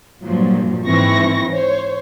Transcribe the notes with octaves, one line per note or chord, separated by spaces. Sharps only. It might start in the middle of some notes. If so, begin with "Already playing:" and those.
G2 A#2 F3 F#3
G#2 E3 C4 E4 C#6 A#6
C5 C#5